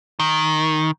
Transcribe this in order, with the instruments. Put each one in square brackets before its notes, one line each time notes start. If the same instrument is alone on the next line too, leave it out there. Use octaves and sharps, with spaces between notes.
[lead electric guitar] D#3